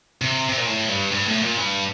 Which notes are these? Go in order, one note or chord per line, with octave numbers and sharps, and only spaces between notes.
C3
C3
A#2
A2
G2
G2
A2
A#2
G2